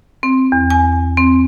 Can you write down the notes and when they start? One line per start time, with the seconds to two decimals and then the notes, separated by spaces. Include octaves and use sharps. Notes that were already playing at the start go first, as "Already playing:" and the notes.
0.23 C4
0.52 E2
0.70 G#5
1.17 C4